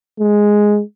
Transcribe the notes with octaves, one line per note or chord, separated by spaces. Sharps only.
G#3